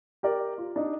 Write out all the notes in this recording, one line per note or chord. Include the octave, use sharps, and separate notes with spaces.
G4 A#4 D5
F4
D4 D#4